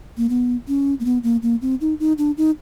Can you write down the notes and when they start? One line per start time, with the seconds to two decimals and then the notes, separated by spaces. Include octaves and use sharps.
0.17 A#3
0.29 B3
0.68 C#4
1.00 A#3
1.05 B3
1.23 A#3
1.42 A#3
1.62 C4
1.81 D#4
2.00 D#4
2.18 D4
2.37 D#4